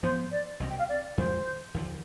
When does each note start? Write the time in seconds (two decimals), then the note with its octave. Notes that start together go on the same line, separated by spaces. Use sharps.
0.03 G#2 F3 B3 C5
0.31 D5
0.60 C2 B2 G#3 C4 D#5
0.70 G5
0.79 F5
0.89 D5
1.17 F2 D#3 G#3 C5
1.74 D#2 D3 F3